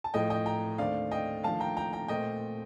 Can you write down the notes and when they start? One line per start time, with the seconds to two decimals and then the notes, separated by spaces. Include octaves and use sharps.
0.04 A5
0.14 A2 F3 A3 D#5 G5
0.30 D#5 G5
0.46 G5 A#5
0.78 D#2 D3 A3 C4 D5 F5
1.11 D#5 G5
1.44 D#2 D3 F3 A3 F5 A5
1.60 G5 A#5
1.77 G5 A#5
1.93 G5 A#5
2.08 A#2 A3 C4 D#5 G5